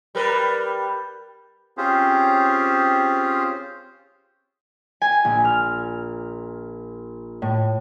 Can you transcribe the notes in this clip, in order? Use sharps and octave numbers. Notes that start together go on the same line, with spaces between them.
G3 A#4 B4
C4 C#4 F4 G4 G#4 C5
G#5
A#1
F6
A2